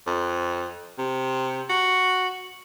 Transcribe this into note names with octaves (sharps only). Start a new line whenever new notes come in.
F2
C3
F#4